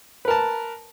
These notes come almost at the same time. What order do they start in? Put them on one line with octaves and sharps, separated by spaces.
B4 A#4 A5